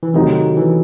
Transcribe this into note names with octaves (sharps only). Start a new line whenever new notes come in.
E3
C3 D#3 F#3 A3 D#4 F#4
E3